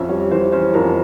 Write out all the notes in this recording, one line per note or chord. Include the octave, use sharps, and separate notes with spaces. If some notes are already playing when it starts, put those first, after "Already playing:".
Already playing: F2 C#4 E5
G3 C#5
E3 C5
C#4 C5
F2 A#4